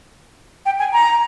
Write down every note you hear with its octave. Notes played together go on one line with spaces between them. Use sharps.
G5
G#5
A#5